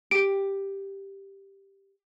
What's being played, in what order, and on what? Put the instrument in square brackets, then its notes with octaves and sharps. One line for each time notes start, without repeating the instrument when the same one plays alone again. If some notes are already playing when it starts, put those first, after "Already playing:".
[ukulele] G4 [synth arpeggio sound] D7